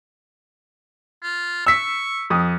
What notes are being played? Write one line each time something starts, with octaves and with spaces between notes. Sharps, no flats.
F4
C#6 E6 B6
F2 D#6